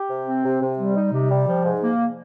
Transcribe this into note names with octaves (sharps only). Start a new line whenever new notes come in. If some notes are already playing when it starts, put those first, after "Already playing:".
Already playing: G4
C3
C4
C3
C3
G3
D#4
C3
G3
F3
G#2
A#3